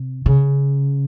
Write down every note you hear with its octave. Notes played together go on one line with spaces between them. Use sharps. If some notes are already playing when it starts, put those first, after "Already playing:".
Already playing: C3
C#3